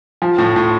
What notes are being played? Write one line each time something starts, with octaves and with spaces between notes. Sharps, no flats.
F3
A2
A2